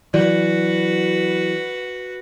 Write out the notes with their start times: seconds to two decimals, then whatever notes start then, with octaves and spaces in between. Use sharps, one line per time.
0.14 E3 F#3 F#4 B4 D5